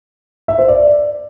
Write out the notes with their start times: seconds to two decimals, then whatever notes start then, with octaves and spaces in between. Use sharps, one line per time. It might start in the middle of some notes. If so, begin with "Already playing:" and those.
0.48 E5
0.58 C5
0.68 D5